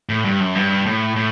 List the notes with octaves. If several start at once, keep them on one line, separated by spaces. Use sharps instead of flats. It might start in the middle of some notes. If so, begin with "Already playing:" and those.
A2
G2
F#2
G2
A2
A2